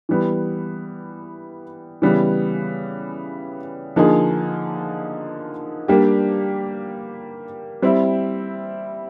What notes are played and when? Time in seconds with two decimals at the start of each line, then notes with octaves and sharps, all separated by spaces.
0.09 E3 G3 B3
2.02 C#3 E3 G3 B3
3.96 D3 F3 A#3 D#4 G#4
5.88 G3 A#3 D4 G4
7.82 G3 C4 E4